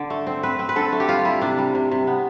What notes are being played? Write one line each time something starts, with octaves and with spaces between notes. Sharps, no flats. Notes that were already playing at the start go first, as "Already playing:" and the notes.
Already playing: D3 D5
A3
C4
C4 B4
C4
B4
D3 A4
A3
G4
G3 F4
G3 E4
C3 D4
G3
C3
C3
B3